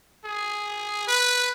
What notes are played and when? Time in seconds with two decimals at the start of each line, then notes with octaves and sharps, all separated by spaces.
0.25 G#4
1.07 B4